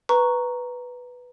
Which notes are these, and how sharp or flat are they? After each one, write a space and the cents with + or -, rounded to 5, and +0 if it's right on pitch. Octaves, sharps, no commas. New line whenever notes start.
B4 +0 A#5 +0 C#6 +0